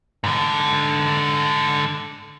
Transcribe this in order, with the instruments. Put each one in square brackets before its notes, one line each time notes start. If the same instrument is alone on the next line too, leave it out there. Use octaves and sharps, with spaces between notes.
[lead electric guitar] G#2 D3